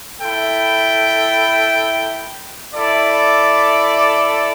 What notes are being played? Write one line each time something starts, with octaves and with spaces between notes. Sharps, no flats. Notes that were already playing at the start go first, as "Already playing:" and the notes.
E4 A4 G5
E4 A4 D5